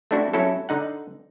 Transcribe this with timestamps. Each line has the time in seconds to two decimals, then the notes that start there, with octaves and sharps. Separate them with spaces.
0.11 A3 C4 D4 E4 F#4
0.33 F#3 C#4 E4 F#4 A4
0.69 D3 D#4 F#5